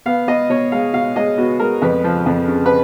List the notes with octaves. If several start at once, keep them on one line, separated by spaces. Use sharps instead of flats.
B3 F5
B3 D#5
B2 C#5
G#3 F5
B2 F5
G#3 D#5
B3 F#4
G#3 A#4
F2 B4
F3
F2
C#3
B4